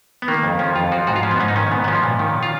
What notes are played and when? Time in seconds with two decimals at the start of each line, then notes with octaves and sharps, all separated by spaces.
0.22 B3
0.28 D#3 A#3
0.43 F2
0.59 F3 C#4
0.76 F2 F4
0.92 F3 F#4
1.07 G#2 F#4
1.16 F4
1.23 F3 C#4
1.31 B3
1.40 G#2 C#4
1.48 D#4
1.56 D#3 C#4
1.71 G#2 B3
1.84 B3
1.88 F3 C#4
2.03 A#2
2.19 D#3
2.43 F4